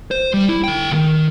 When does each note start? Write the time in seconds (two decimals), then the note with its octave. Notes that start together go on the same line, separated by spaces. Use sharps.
0.11 C5
0.34 G3
0.49 E4
0.64 D3 G5
0.91 C#2 D#3